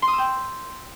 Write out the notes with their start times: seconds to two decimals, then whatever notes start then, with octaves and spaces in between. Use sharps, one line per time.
0.02 C6
0.08 D#6
0.13 E6
0.18 G5